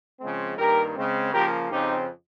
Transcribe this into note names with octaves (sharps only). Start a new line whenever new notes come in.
C#3 F3 G#3 C4
G2 D#3 A#3 G4 A#4
C#3 G#3 C4
C#3 F3 A#3 G4 A#4
F2 C#3 F3 C4 D#4 G4